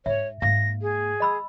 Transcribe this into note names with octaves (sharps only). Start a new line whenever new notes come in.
G#2 C#5 E5
G#2 A#3 F5 A#6
G#4
D#5 B5 E6